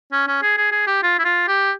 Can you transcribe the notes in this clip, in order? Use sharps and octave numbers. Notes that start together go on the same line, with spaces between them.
C#4
C#4
G#4
G#4
G#4
G4
F4
E4
F4
G4